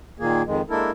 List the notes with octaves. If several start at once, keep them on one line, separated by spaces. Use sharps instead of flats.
A#2 D#3 A#3 G#4
F2 D#3 G#3
G#3 A#3 D4 E4 A4 A#4